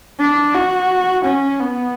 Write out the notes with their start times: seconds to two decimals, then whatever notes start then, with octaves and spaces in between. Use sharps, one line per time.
0.19 D4
0.54 F#4
1.25 C#4
1.60 B3